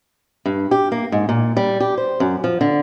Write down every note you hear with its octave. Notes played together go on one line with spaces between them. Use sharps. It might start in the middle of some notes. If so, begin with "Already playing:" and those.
G2
G4
A#3
G#2
A#2
G3
G4
C5
F#2
F3
D3